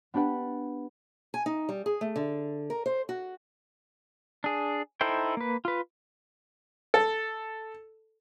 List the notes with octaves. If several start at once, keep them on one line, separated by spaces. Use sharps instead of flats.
B3 D4 G4 B4 F#5
G#5
D#4
G3
G#4
A3
D3
A#4
C5
F#4
D4 G#4
D#4 E4 A4 C5 G5
A#3 B4
F4 B4
A4